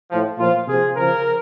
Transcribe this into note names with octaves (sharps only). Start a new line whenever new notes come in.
A2 F3
A#2 F3 F4
C3 F3 G#4
C#3 F3 A#4